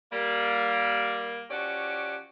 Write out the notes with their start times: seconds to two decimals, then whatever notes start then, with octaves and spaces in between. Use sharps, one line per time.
0.12 G3 A#3
1.50 F3 C#4 F#4 G4 D5